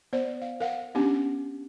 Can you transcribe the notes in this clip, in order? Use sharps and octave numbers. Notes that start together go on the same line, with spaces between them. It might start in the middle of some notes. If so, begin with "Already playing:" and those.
B3 C5 D5
F5
A#4 F5 F#5
B3 C#4 D4 G4